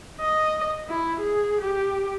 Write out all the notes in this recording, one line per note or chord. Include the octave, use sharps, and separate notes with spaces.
D#5
E4
G#4
G4